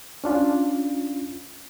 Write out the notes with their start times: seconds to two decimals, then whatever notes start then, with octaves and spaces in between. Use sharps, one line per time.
0.24 C#4 D4 F4